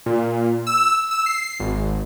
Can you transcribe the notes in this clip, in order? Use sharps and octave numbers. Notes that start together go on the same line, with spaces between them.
A#2
E6
E6
C7
G#1